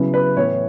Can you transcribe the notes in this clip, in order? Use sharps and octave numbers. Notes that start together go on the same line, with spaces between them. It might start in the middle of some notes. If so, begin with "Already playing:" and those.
Already playing: C#3 F#3 B3 E4
B4
A2 E3 B3 C#5